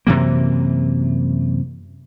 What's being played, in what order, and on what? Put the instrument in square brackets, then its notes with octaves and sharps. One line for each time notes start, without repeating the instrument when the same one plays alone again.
[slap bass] F#2 C3 E3 A#3